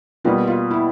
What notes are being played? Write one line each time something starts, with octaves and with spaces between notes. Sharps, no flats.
B2 G3 A#3 F4
F4
E4